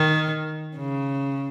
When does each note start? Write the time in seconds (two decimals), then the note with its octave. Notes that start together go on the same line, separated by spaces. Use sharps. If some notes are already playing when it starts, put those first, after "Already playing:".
Already playing: D#3
0.77 C#3